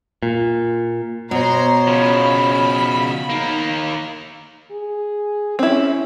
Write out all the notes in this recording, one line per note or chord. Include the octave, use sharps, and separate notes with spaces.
A#2
B2 C5 C#5 A#5 C6
C#3 F3 B5
D#2 A#3 D#4
G#4
C4 C#4 E4